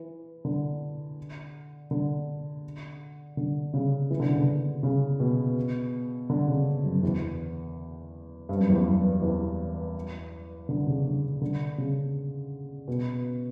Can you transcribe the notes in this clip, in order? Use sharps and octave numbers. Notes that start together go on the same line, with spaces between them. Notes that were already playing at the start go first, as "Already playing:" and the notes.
Already playing: E3
D3
D3
D3
C#3
E3
D3
C#3
D3
C#3
B2
D3
C#3
F#2
E2
G2
F#2
E2
F#2
E2
D3
C#3
D3
D3
C#3
B2